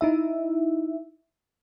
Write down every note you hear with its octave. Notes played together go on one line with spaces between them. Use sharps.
D#4 E4 E5